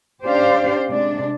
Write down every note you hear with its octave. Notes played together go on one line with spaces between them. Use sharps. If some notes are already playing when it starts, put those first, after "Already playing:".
C#4 D4 G4 C5 D5 F5
C3 G#3 D4